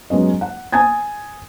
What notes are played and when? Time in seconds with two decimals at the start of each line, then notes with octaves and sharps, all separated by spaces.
0.10 F#3 G#3 B3 C#4 D#5
0.41 F#5
0.73 G#5 D#6 G#6 A6